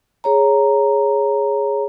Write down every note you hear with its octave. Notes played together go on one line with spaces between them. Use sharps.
G#4 C#5 A#5